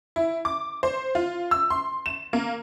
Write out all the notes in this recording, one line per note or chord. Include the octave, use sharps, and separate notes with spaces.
E4
D6
C5
F4
E6
C6
E7
A#3